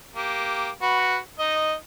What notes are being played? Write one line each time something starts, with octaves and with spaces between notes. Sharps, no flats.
A#3 G4
F#4 B4
D#4 D#5